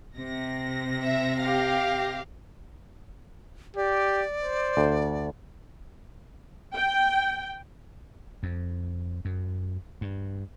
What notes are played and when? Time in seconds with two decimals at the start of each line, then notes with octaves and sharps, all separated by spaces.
0.17 C3 A#6
1.04 E5
1.40 G4 F5
3.76 G4 D5
4.39 C5
4.77 D2
6.75 G5
8.43 F2
9.25 F#2
10.01 G2